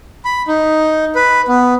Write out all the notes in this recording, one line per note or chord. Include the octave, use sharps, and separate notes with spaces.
B5
D#4
B4
B3